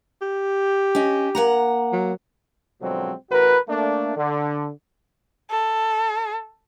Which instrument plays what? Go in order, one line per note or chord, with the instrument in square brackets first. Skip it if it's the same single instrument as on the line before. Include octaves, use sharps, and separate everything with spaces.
[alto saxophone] G4
[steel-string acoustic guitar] C#4 D#5
A#3 F#5 A#5
[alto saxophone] F#3
[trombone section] B2 D3 F3 F#3 G#3 C4
A1 F#4 A#4 B4
A3 A#3 D4
D3
[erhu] A4